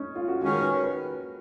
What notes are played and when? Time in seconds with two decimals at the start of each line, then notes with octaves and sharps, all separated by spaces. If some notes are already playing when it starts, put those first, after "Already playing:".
Already playing: C#4 D#4
0.15 F4
0.28 F#4
0.42 D#3 G#3 C#4 F#4
0.53 A#4
0.62 B4
0.83 B4